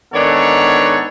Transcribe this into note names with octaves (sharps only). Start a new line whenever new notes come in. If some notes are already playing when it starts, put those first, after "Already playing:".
G#2 D#3 B3 D4 A4 C#5